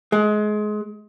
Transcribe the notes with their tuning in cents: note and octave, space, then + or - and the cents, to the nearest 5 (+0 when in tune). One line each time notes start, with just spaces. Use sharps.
G#3 +25